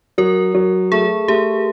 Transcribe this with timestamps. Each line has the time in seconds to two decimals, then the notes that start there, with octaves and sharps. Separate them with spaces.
0.18 F#3 A#4
0.55 F#3
0.92 A3 G#4
1.28 A3 G4